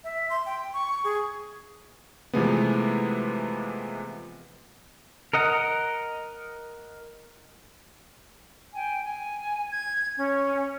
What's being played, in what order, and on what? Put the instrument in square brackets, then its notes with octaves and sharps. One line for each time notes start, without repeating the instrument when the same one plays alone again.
[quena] E5
C6
G5
C#6
G#4
[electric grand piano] C3 E3 F3 G#3 A3 B3
[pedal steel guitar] A#4 D#5 F#5
[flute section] G5 G#5
G#5
G#6
C#4 C#5